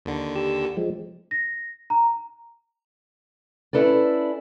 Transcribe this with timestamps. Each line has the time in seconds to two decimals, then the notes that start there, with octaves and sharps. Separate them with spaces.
0.05 D#2 D3
0.36 G4 E6
0.77 F3 G#3
1.31 A#6
1.90 A#5
3.73 C#4 D#4 E4 A4 B4 D5